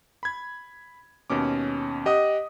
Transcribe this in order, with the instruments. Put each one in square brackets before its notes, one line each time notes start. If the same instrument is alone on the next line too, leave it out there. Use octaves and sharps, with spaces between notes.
[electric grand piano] B5 G#6
D#2 B2 C#4 D6
G4 D#5 F#5 D#6